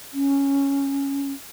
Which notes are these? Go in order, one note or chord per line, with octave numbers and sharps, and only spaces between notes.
C#4